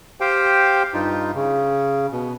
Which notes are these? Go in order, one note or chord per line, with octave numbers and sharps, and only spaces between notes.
G4 C5 F5 G5
G2 D#4 F4
C#3
B2